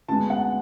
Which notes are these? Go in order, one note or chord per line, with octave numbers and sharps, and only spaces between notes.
D2 D3 G#3 B3 A5
F#5